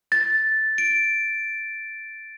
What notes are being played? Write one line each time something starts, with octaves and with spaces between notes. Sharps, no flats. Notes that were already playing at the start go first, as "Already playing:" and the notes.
A6
D7